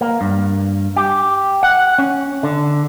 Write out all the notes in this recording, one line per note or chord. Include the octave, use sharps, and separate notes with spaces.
A#3
G2
G4
F#5
C#4
D3